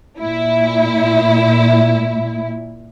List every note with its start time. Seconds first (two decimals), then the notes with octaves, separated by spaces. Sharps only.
0.19 A#2 E4